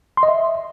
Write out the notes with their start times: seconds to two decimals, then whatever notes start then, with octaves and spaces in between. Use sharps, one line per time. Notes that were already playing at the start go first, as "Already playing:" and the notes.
0.17 C6
0.23 D#5
0.28 E5